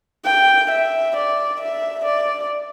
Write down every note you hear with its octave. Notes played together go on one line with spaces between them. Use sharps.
G5
E5
D5
E5
D5